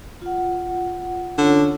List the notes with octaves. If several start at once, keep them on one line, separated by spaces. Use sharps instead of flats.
F4 F#5
D3 C#4 F4 C#5